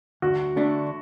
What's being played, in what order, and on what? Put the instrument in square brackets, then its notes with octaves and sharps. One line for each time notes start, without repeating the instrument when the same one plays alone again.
[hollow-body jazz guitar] D2 [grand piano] F#4
[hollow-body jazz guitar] D3 A3 D4